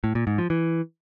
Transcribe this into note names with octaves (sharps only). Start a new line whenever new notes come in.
A2
A#2
G#2
F3
E3